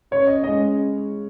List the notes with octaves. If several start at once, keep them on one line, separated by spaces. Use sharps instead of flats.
C#3 C#5
D#5
G#3 C#4 D#5